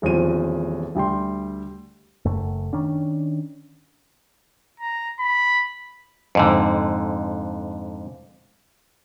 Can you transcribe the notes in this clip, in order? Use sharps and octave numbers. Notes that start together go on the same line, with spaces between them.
D#1 E2 F3 C4 C5 D#7
D2 G3 G5 C6
F#1 F#2 A3
D#3 C#4 D4
A#5
B5
F2 G#2 D3